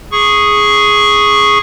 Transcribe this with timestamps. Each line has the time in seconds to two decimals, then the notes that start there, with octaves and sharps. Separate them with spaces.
0.11 G#4 C#6